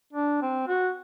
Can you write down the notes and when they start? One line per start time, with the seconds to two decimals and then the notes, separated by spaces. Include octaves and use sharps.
0.13 D4
0.42 C4
0.68 F#4